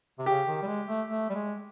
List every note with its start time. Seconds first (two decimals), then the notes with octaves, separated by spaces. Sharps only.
0.19 C3
0.26 C#3 G4
0.47 D#3
0.62 G3
0.67 G#3
0.88 A3
1.08 A3
1.30 G3
1.35 G#3